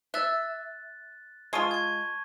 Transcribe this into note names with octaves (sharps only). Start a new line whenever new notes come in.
E5 F#6 A6
G#3 F4 A5 C#6 D#7
C#6 G#6